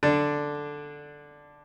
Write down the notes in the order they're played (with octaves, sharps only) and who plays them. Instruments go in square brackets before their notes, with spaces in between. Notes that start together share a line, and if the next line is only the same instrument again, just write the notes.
[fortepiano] D3 D4